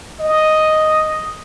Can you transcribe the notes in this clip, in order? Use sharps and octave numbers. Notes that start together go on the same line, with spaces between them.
D#5